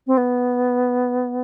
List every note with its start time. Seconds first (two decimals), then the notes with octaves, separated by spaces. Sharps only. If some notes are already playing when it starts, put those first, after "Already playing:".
0.07 C4
0.17 B3